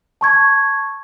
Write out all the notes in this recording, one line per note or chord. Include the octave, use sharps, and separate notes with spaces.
A5 C#6 G#6